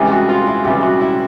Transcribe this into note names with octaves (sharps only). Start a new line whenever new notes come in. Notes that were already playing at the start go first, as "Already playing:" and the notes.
Already playing: C#2 C3 E3 G3 G#4
F#4
F4
E4
C#2 C3 E3 G3 G4
F#4
E4